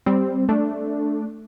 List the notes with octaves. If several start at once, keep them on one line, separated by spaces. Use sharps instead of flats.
G3 C4
A3 D4